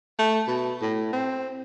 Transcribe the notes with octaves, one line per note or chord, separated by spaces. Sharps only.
A3
B2
A2
C4